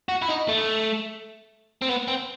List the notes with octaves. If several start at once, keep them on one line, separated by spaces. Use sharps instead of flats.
F#4
E4
D#4
A3
C4
B3
C4